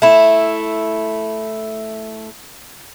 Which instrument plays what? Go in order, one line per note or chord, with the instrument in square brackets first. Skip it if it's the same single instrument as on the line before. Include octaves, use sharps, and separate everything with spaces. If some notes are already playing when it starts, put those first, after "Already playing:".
[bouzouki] A3 E4